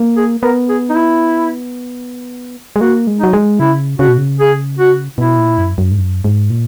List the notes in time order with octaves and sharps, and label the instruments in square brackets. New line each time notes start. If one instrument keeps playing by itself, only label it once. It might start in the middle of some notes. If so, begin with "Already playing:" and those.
Already playing: [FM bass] A#3
[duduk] G#4
[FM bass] B3 [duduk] A#4
[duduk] G#4
D#4
E4
[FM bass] G#3
[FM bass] A#3 [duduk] F#4
[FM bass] G#3
[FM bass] F#3 [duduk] D#4
[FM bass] G#3
[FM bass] C#3 [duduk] E4
[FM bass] C#3 [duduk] F#4
[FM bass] B2
C#3
[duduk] G#4
F#4
[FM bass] B2 [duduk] E4
[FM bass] A#2
F#2
F#2
G#2
F#2
G#2
A#2